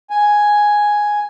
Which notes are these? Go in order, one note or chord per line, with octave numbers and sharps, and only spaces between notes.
G#5